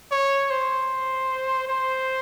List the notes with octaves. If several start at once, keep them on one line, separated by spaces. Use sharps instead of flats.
C#5
C5
C5